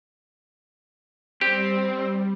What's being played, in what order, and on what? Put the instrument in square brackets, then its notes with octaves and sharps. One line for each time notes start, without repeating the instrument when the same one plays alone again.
[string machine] G3 [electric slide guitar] C4 [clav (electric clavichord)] G4